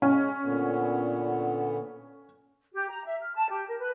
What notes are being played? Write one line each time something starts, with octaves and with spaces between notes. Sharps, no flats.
G#3 C#4 D#4
A#2 D3 B3
G4
A#5
E5
F6
A5
G4
A#4
B4